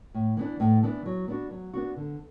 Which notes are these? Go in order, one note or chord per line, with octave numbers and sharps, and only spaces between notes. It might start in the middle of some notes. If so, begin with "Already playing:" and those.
A2
E3 B3 D4
A2
E3 B3 D4
F#3
B3 D4 F#4
F#3
B3 D4 F#4
D3